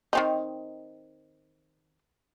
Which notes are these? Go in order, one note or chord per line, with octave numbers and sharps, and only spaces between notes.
D#3 C4 D#4